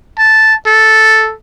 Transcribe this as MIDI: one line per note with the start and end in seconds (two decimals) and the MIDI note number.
0.19 0.54 81
0.67 1.34 69